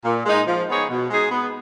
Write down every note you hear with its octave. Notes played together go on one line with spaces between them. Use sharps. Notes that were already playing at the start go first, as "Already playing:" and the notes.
A#2
G#3 D#4
F3
B3 D#4 G#4 C#5
B2
G#3 D#4 G#4
B3